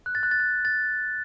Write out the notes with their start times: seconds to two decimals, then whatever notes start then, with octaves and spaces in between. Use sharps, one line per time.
0.06 F#6
0.15 A6
0.23 F#6
0.31 A6
0.40 F#6
0.65 A6